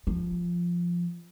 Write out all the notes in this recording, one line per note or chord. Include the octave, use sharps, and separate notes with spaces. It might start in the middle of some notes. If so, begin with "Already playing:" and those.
F3